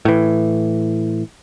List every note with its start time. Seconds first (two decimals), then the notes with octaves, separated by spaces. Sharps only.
0.05 A2 E3